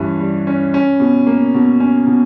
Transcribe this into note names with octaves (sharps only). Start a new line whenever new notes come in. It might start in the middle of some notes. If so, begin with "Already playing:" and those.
Already playing: G2 E3 C#4
G3
C#4
C#4
B2
A#3
B2
C#4
B2